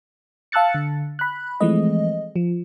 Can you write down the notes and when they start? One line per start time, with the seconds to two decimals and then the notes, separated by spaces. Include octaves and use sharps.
0.52 F5 A5 E6 F#6 A6 C#7
0.75 D3
1.19 B5 F#6
1.61 E3 F3 G#3 A3 C4 D#5
2.36 F3